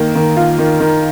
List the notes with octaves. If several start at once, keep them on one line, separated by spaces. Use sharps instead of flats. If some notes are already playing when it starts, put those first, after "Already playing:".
Already playing: D#3 A#3
D#3
F4
D#3
D#3